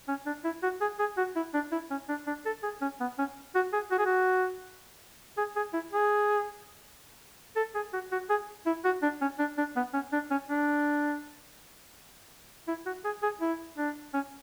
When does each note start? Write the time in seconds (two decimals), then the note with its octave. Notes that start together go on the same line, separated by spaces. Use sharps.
0.08 C#4
0.26 D4
0.44 E4
0.63 F#4
0.81 G#4
0.99 G#4
1.17 F#4
1.36 E4
1.54 D4
1.72 E4
1.90 C#4
2.09 D4
2.27 D4
2.46 A4
2.63 G#4
2.81 C#4
3.00 B3
3.18 C#4
3.55 F#4
3.73 G#4
3.91 F#4
3.99 G#4
4.06 F#4
5.38 G#4
5.56 G#4
5.74 E4
5.92 G#4
7.56 A4
7.75 G#4
7.93 F#4
8.12 F#4
8.30 G#4
8.66 E4
8.85 F#4
9.02 D4
9.21 C#4
9.39 D4
9.58 D4
9.76 B3
9.93 C#4
10.13 D4
10.31 C#4
10.49 D4
12.68 E4
12.86 F#4
13.05 G#4
13.23 G#4
13.41 E4
13.78 D4
14.14 C#4